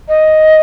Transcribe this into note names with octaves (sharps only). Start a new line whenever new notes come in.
D#5